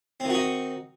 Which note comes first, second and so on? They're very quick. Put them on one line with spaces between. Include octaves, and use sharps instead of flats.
C4 D#3 F#4 D#4